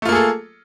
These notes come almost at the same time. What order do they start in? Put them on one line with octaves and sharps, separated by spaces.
A3 F4 A#3 G#4 A4